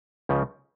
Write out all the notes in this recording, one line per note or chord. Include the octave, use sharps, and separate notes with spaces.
C#2 C#3 F3